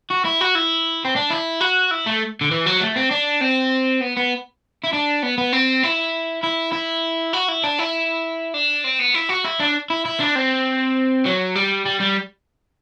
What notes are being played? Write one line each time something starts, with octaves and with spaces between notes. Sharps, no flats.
F#4
E4
F#4
E4
C4
D4
E4
F#4
E4
A3
D3
E3
F#3
A3
C4
D4
C4
B3
B3
E4
D4
B3
B3
C4
E4
E4
E4
F#4
E4
D4
E4
D4
C4
B3
E4
F#4
E4
D4
E4
E4
D4
C4
F#3
G3
G3
G3